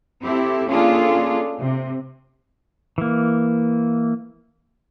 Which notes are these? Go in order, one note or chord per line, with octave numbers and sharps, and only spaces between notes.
C4 E4 G4 A4
A#3 C#4 D4 F4 G#4 A4
C3
E3 A#3